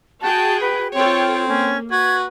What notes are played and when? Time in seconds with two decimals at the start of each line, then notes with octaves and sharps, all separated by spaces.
0.22 F#4 G#4 G5 A5
0.61 B4
0.95 C4 F4 A4 C#5 G5
1.48 A#3 C#4
1.91 F#4 B4 G#6